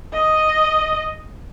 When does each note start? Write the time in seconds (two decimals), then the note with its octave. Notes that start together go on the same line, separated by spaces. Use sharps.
0.13 D#5